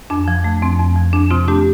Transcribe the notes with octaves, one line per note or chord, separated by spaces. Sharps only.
F2 D4
F3
A3
F2 C4
F2
F3
F2 D4
C3 C4 F4
A3 D4 G4